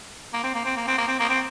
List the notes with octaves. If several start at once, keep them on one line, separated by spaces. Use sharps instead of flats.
A#3
C4
A#3
C4
A#3
C4
A#3
C4
A#3
C4